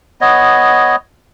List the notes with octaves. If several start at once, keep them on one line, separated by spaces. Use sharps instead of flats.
B3 C#5 D#5